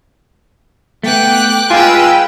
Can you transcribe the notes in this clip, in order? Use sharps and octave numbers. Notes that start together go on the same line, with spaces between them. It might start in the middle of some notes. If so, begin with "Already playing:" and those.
A3 B3 G5 D6 F#6
G#3 F4 B4 G5 G#5 E6